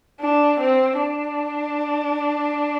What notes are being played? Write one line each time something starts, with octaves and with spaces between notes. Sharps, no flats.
D4
C4
D4